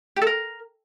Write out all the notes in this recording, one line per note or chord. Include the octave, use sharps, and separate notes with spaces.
G4
A4
A#4